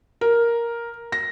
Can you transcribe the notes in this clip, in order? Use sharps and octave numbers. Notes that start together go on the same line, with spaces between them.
A#4
A#6